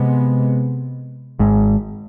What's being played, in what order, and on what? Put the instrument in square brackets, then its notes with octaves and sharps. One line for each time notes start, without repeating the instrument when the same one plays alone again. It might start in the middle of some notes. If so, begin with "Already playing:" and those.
Already playing: [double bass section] C3 G#3 B3
[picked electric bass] G#1 G#2